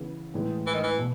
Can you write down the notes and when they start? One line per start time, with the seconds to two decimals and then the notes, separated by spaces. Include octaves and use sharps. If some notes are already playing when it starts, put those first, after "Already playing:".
Already playing: C#3 E3 B3
0.34 A2 E3 G#3
0.67 E3
0.74 D#3
0.83 E3
0.98 B2